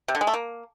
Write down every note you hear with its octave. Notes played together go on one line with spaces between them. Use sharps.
C3
D3
G#3
A3
A#3